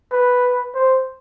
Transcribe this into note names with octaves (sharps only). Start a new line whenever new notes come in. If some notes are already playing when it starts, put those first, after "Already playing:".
B4
C5